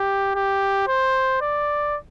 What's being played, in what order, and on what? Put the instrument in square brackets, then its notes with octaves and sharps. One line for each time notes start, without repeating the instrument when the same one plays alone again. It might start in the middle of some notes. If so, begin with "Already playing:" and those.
Already playing: [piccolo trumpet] G4
G4
C5
D5